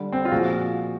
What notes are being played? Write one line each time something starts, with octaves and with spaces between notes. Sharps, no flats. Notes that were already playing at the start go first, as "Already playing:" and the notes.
Already playing: D3 G3
C4
F4
A#2 F3 G#3 F#4